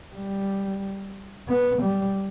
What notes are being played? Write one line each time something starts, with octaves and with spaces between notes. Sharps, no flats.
G3
B3
G3